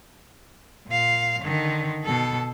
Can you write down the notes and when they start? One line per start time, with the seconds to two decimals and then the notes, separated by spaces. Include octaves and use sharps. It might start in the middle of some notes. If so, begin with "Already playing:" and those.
0.88 A#2 F5
1.42 D3 D#3
2.04 B2 A4